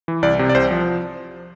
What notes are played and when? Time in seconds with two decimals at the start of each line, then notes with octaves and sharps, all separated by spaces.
0.08 E3
0.22 C2 D5
0.39 C3
0.49 D5
0.55 C2 C5
0.71 F3